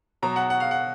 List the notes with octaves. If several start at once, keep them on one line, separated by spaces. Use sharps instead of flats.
B2 F#3 A#5
F#5
F#5
F5
F#5